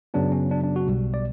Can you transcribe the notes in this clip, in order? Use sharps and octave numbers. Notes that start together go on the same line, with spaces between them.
F#2 C#3 F#3 B3 D4
C#4
D4
D4
F#4
B1 B2 G3
D5